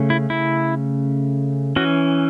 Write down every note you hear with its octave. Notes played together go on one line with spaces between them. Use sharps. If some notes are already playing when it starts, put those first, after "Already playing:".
Already playing: C#3 A3 C#4
E4
E4
E3 C#4 F#4